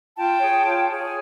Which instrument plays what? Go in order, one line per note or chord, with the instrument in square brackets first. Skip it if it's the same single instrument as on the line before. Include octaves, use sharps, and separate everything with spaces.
[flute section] F4 G5 A5
G#4 C#5
F4
G#4 C#5
G#5